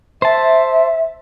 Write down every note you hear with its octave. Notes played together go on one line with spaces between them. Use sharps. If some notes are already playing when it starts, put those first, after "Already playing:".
C5 E5 A5